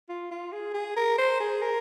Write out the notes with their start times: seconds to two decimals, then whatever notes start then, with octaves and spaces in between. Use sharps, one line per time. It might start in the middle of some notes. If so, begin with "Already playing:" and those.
0.09 F4
0.31 F4
0.52 G#4
0.74 G#4
0.97 A#4
1.18 C5
1.40 G#4
1.62 A#4